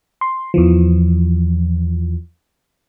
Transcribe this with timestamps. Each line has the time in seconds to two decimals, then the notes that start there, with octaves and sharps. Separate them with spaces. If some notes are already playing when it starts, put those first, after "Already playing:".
0.21 C6
0.54 E2 E3 F3